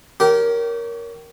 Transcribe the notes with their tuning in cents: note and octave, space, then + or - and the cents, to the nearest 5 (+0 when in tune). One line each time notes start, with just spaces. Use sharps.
C#4 +15 G4 -25 A#4 +0